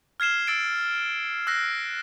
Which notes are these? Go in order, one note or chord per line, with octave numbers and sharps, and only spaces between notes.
F6 G#6 C7 E7 G7
E6 A6 D7
E6 F#6 A#6 C7